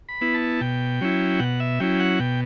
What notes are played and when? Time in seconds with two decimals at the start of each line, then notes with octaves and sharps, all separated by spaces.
0.09 B5
0.21 B3 E4
0.34 A5
0.61 B2 G5
1.01 F#3 C#4 E4
1.40 B2 F#5
1.60 E5
1.80 F#3 C#4 E4 G5
2.00 F#5
2.19 B2 G5